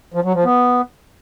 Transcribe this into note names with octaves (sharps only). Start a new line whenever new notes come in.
F3
F#3
F3
B3